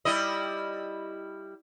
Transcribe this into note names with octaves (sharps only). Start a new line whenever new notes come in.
G3 E4 D#5